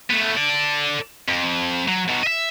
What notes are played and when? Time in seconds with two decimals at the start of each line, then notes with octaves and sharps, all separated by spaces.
0.10 A3 B3
0.37 A4 D5
1.28 F2
1.88 F#3
2.09 B2 F#3
2.23 D#5 E5